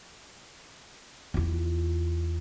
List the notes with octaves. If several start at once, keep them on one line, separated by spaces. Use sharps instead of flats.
E2 F4